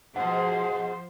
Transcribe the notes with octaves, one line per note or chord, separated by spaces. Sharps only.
G#2 B2 F3 C5 F#5